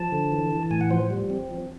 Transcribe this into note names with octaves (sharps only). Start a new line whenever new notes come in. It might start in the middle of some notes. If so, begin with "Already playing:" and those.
Already playing: F3 A5
D3
E3
E3
A2 G#5
F#5
F3 C5
G3
C4
F3